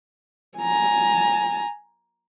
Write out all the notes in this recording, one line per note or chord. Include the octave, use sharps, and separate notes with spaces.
G#5 A#5